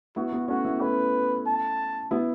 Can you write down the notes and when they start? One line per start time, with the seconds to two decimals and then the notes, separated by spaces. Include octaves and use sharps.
0.16 B3 E4 F#4
0.32 B3
0.48 A3 C#4 F#4
0.65 B3 E4
0.81 A3 C#4 B4
1.46 A5
2.11 B3 E4